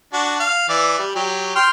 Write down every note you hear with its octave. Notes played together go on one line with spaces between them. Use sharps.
D4 F#4 A5
F5
E3 D5
G3
F#3 G4
G5 C6 F6